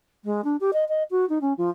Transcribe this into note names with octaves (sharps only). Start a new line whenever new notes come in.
G#3
D4
G4
D#5
D#5
F#4
D#4
C#4
F3